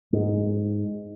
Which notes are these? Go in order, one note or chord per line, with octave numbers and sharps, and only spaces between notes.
G#2 G#3